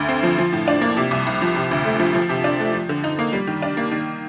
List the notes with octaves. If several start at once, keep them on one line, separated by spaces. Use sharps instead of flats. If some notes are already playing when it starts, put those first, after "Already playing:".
Already playing: D2 D3
C4
F3
F3
A2
D4
A#3
C3
C2
C2
F3
C3
D2
A3
F3
F3
C3
D4
A3
F3
D3
D#4
A#3
G3
D#3
D4
A#3
D#3